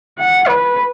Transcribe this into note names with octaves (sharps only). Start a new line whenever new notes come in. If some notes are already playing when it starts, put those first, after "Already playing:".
F#5
B4